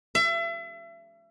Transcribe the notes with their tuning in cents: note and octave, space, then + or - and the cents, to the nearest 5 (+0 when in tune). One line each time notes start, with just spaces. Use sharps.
E5 +35